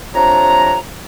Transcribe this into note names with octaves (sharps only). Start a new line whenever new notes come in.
F2 C3 D4 C#5 A#5